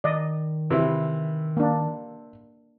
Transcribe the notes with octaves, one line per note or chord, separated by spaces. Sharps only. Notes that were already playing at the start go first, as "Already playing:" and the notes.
D#3 D5 D#5
C3 E3 E4
A#3 D4